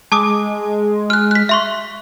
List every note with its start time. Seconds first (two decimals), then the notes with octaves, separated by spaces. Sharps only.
0.12 G#3 A5 D6 D#6
1.10 F6 F#6
1.31 F#6 B6
1.49 E5 C6 C#6